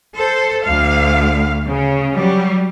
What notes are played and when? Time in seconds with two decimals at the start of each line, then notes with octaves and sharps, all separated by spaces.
0.16 A4 C5
0.64 D2 F5
1.67 C#3
2.14 F#3 G3